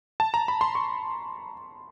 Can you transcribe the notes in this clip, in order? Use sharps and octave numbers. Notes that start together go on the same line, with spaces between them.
A5
A#5
B5
C6
C#6